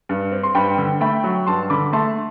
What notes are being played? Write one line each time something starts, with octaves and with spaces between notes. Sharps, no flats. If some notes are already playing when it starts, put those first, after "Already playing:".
G2
C4
C6
G2 G5 B5
D3
A3 G5 B5
F#3
G2 A5 C6
D3 B5 D6
A3 A5 C6